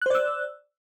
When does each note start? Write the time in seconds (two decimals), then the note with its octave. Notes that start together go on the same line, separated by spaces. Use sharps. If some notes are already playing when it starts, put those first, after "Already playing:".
0.02 F#6
0.06 C5
0.10 D5
0.15 E6